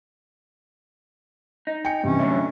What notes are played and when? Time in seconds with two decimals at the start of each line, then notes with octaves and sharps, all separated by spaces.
1.67 D#4
1.85 G5 G#5 C#7
2.03 G2 C3 E3 C#4
2.19 A2 D3 F#3 E5